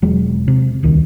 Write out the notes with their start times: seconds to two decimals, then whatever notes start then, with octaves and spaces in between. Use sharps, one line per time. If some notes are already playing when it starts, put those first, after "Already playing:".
0.02 E1 F#3 G#3
0.48 C3
0.83 D#1 C#2 D#3